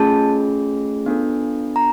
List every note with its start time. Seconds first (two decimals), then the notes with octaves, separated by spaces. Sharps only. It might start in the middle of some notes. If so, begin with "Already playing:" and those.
Already playing: A3 C#4 F4 G#4 A5
1.06 B3 D4 F4 A4
1.76 A#5